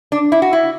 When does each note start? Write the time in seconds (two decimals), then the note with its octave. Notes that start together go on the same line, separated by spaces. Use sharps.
0.12 D4
0.32 E4
0.42 F#4
0.53 E4